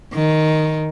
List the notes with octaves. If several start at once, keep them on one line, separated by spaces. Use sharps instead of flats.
D#3